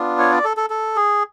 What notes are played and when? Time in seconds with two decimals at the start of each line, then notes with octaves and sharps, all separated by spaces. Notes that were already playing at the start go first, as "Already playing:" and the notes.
Already playing: B3 D4 F4
0.19 C#5
0.31 D5
0.44 A4
0.57 A4
0.70 A4
0.96 G#4